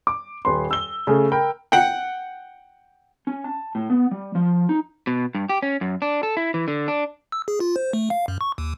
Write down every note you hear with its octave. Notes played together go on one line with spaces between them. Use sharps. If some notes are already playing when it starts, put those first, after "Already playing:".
D6
D#1 B4 C6
E6 G7
C#3 A3 G#4 A4
A#4 G5 B5
F#5 G5
C#4
A5
A2
B3
G3
F3
D#4
B2
G2
G4
C#4
F#2
D4
A4
E4
E3
D3
D4
E6
G#4
F4
C5
A3
F5
F#2
C#6
D#2